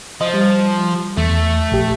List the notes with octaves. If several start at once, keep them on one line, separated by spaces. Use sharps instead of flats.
F3 D#5
G3
E2 A3
A#1 G4